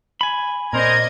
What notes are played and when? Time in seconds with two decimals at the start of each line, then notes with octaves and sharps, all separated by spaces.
0.21 G#5 B5
0.73 A#2 C4 A#4 C5 D5 D#5 A#5 G#6